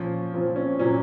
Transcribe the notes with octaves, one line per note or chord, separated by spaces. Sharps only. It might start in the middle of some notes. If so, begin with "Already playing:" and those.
Already playing: A#2 F3 C#4
A#2 F3 C4
C#4
A#2 F#3 C#4